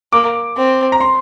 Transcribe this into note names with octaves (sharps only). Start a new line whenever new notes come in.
A#3 D6
C4
A#5
C6